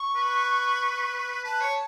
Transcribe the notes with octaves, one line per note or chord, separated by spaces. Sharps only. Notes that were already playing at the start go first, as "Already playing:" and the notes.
Already playing: C#6
B4
B4 A5
C#5